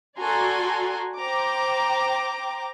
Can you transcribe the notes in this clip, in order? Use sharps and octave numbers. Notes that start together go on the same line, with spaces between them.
F#4 A4 D5 G#5 A#5 C6
C5 G5 A#5 D6